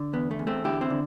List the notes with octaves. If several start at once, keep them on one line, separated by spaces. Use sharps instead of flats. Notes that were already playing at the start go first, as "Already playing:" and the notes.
Already playing: D3
E2 B3
A3
E2
A3 C4
D3 E4 G4
C4 E4
D3